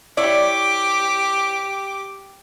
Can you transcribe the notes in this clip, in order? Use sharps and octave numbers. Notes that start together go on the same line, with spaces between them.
E4 G4 C#5 D5 D6